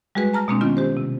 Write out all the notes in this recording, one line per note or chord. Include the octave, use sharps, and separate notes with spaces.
G3 G#3 F#4 G#4 B4
A5 A#5 F6 A#6
B2 G#3 A#3 C4 D4
D#3 B3 C#4 F4
G4 C5
C3